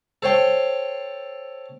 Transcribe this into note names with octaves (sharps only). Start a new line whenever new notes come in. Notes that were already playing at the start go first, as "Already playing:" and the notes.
A4 C5 C#5 G5